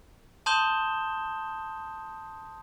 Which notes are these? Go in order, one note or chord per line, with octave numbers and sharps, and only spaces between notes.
A5 C6 D#6 G6 E7 G7